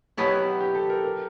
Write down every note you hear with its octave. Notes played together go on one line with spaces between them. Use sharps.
B2 F#3 B3 E4 G4
G4
A4
A#4
A#4